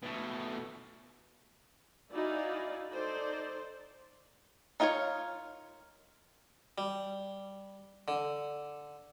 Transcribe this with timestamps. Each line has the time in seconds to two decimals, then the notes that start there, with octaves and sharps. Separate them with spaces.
0.03 B2 A3
2.13 D#4 E4 F#4 D5 F5 G#5
2.90 D#4 A4 C5 D5
4.80 D#4 F4 A#4 C5 C#5
6.78 G3
8.08 D3